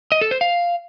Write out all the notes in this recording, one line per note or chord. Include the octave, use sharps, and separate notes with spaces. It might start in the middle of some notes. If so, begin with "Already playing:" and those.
D#5
A4
C5
F5